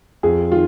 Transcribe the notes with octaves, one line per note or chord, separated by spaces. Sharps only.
F2 G#4
D#3 F4